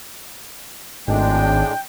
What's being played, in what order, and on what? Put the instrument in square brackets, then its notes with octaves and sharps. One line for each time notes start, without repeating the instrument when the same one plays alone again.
[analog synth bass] G#1 [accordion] A2 G#3 D4 [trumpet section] G5